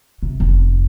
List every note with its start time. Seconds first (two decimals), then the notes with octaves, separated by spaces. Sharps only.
0.23 C3
0.40 F1